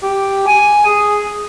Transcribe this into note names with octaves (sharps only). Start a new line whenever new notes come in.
G4
G#5
G#4